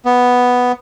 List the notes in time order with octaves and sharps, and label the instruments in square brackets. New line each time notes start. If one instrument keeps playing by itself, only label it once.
[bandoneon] B3